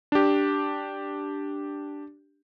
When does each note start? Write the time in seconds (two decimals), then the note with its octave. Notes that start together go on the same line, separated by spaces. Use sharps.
0.12 D4 G4